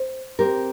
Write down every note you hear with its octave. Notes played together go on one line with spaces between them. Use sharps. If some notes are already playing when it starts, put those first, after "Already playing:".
Already playing: C5
C4 G4 A#4